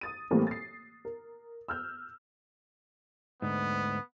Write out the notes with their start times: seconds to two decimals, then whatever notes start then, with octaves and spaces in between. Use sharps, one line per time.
0.01 D#6 A6 D#7
0.31 A2 E3 G3 A#3 C4
0.47 A6 C7
1.05 A#4
1.68 E6 F6 G6
3.42 D2 G#2 B3